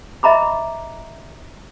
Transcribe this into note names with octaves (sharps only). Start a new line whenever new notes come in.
D#5 E5 A#5 B5 D6